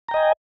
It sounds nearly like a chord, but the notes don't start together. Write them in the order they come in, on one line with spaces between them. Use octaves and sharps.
A#5 G5 D#5 G#5